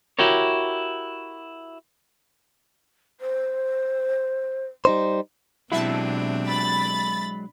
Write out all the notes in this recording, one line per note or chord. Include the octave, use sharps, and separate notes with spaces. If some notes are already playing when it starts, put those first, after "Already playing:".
E4 F#4 G4 A#4 C#5
C5
G3 D#4 C5
B2 F#3 G#3 C4 D4 E4 E5 A5
B5 A6